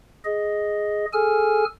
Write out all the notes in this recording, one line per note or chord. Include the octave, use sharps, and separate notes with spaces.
G#4 D#5
G#4 A4 G#5 F6